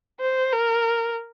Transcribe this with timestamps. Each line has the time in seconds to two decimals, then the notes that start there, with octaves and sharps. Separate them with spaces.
0.20 C5
0.53 A#4